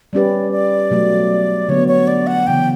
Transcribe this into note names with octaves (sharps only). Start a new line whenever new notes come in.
G3 C#4 G4 B4 D5
D5
B2 F#3 A3
D3 F#3 B3 C#5
C#5
D5
F#5
C#3 E3 B3 G5